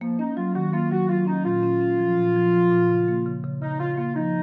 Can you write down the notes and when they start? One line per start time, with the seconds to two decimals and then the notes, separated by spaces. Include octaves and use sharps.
0.01 F3 A#3
0.19 C#4 D#4
0.37 F#3 F4
0.55 D#3 F#4
0.73 A#3 F4
0.91 F#3 F#4
1.09 F#3 F4
1.27 C#4 D#4
1.45 A#2 F4
1.63 C#4
1.81 C#4
1.99 F3
2.17 A#2
2.36 F3
2.53 F3
2.71 A#2
2.89 C#3
3.08 A#3
3.26 C#3
3.44 C#3
3.62 C#3 D#4
3.80 C#3 F4
3.97 A#3 F4
4.16 F3 D#4